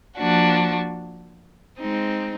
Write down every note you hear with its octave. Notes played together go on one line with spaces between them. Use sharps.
F3 A#3 D4 F#4
G#3 C4 D#4